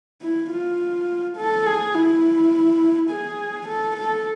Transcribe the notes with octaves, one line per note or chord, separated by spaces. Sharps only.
E4
F4
A4
G#4
E4
G#4
A4
A4